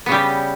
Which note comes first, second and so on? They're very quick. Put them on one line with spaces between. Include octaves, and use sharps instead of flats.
B3 C#3 G3 G4